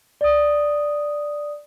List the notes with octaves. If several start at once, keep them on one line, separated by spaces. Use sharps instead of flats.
D5 D#6